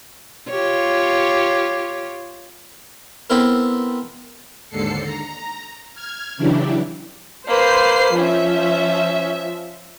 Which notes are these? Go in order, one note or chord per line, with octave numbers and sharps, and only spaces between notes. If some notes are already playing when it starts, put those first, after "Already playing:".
F4 G4 C#5
B3 C4 E4 A4 A#4
D#2 G#2 D3 A4 C7 C#7
A#5
F6 G#6
C#3 E3 F#3 D4 E4 G4
A#3 B4 C5 C7
F3 C#4 E5